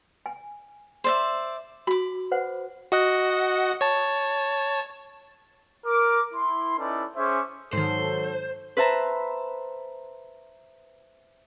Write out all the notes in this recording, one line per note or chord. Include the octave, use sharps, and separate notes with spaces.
G#5
C5 D5 E5
F#4 B5 D6
B4 C5 F#5
F#4 D#5 F#5
C#5 A5
A#4 D6
E4 C6
C#4 D#4 E4 A4 B4 D5
C#4 G#4 C5 E5 C#6 D6
G#2 D#3 F#3 A4 C5
B4 C5 E5 A5 A#5